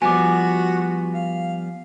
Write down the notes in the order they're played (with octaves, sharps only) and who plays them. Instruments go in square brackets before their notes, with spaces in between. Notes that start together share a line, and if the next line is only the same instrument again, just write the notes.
[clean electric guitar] F3 G3 B3 [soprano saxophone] F#4 [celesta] G#5 D6
[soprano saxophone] F5